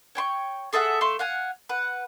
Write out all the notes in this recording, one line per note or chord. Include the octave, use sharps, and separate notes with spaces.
C#5 G5 C6 C#6
G#4 A4 E5 F#5
A3 E5 F5 C6
F5 F#5 G#5
B4 F#5